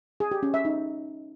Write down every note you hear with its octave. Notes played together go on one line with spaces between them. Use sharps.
G#4
G4
C#4
E5
D#4